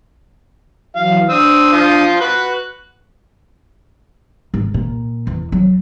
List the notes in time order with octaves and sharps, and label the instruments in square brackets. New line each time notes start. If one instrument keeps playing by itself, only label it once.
[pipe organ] E3 F#3 [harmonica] F5
[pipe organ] D4 D#6 [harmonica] C5 E6
[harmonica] F3 F4
[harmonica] F#4 B4 [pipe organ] F#6
[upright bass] G#1
A#2
E2
F#3